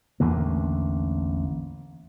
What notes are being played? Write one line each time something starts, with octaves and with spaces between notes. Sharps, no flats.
A1 E2 D3 A#3